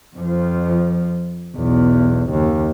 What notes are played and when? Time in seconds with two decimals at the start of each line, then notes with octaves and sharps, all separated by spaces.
0.16 F2 F3
1.56 B1 E2
2.30 F#1 D#2